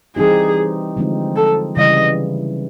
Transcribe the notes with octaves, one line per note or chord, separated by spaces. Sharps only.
E3 G3 C4 D#4 G4 G#4
D3 F3 G#3 C4 D#4
A4
C#3 E3 G3 D#5